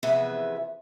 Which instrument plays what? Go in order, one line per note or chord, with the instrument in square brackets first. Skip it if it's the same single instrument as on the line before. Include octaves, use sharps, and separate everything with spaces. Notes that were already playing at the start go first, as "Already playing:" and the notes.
[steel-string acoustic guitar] F2 C3 E3 B3 G#4 E5